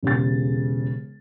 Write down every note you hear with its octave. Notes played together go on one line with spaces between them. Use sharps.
E1 C#3 G4 A6